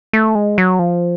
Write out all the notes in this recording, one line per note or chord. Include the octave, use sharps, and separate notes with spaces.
A3
G#3
F#3
F3